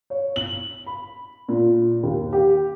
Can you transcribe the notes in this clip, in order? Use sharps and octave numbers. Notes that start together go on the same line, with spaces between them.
C#5
F#7
B5
A#2
D#2
G4